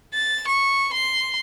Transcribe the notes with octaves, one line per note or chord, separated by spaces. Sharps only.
A6
C#6
C6